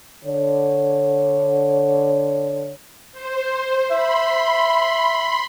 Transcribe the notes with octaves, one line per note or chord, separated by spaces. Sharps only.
D3 C#5
C5
E5 B5 C6